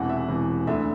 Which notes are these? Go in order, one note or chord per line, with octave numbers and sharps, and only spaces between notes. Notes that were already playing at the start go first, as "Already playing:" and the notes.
Already playing: E1 E2 C3 E3 F#5
E5
E1 E2 C3 E3
D2 D3 E5